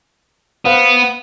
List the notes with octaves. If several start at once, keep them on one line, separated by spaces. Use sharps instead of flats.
B3 B4 C5 F5